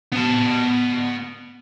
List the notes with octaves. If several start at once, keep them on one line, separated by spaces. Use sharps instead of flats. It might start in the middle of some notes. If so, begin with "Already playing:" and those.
B3 A5